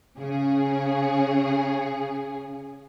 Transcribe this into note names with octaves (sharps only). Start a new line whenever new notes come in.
C#3 G#4